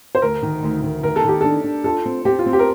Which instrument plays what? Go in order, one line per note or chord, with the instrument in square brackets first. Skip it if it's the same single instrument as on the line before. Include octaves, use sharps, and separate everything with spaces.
[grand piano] C5
[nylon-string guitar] D2 [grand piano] A#4
[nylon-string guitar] D#3
D2
D#3
[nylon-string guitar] D#3 [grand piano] A#4
[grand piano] A4
[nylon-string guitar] D#3 [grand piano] G4
[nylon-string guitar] D4 [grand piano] A4
[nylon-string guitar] D4
[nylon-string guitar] F4 [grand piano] A4
[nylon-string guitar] C4
[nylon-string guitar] C4 [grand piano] G4
[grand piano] F4
[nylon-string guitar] C4
[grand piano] G4
A#4